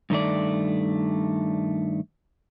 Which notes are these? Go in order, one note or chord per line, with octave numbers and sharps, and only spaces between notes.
G2 D#3 A3 D5